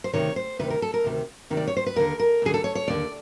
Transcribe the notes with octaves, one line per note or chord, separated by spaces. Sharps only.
C5
D2 C3 D#3 C#5
C5
D2 C3 D#3 B4
A#4
A4
A#4
D2 C3 D#3
D2 C3 D#3
D5
C#5
C5
B4
D#2 D3 A#4
A#4
D#2 D3 G#4
A4
C#5
C#5
D#2 D3 D5